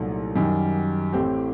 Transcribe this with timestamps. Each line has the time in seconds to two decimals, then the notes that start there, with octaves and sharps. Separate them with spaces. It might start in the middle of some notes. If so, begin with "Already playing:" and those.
Already playing: C2 A#2 F#3 A3 D#4
0.36 F#2 D#3 G3
1.13 A1 A2 A3 C4 G4